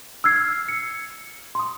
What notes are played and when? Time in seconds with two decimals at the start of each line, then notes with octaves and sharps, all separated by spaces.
0.24 E6 F6 G#6 C7
0.69 C#7
1.55 C6 D#6